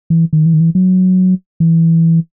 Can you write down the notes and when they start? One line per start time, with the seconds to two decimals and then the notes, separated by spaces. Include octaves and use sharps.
0.10 E3
0.33 D#3
0.46 E3
0.54 D#3
0.60 E3
0.75 F#3
1.60 E3